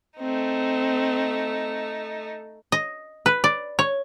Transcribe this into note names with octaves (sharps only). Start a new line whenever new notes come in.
A3 C4 D#4
D#5
B4
D5
C#5